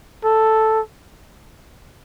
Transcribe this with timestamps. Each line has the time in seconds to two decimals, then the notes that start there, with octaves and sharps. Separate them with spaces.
0.25 A4